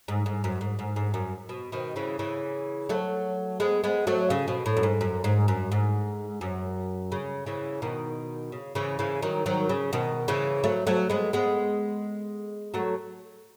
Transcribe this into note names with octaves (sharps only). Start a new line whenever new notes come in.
G#2
G#2
F#2
G#2
G#2
G#2
F#2
B2
B2 D#3
C#3 E3
C#3 E3
F#3 A3
G#3 B3
G#3 B3
F#3 A3
C#3
B2
A2
F#2
G#2
F#2
G#2
F#2
G#2
F#2
C#3
C#3 E3
B2 D#3
C#3
C#3 E3
C#3 E3
D#3 F#3
D#3 F#3
C#3
B2 D#3
C#3 E3
F#3 A3
F#3 A3
G#3 B3
G#3 B3
F#3 A3